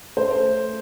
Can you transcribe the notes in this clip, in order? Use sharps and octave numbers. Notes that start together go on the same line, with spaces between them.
A3 C5